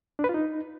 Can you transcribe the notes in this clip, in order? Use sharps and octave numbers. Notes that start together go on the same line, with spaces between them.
D4
B4
F4
D#4